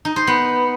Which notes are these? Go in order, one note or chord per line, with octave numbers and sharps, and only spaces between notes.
D#4
C5
B3